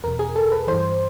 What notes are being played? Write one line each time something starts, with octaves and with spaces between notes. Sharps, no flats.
E2 B2 A#4
G#4
A4
B4
G2 E3 C5